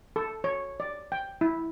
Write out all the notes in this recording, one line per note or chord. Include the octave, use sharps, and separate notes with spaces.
A4
C#5
D5
G5
E4